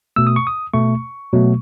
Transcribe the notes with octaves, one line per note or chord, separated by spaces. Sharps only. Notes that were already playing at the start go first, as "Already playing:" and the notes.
B2 A3 E6
D#6
C#6
D#6
B2 A3 C#6
B2 F#3 A3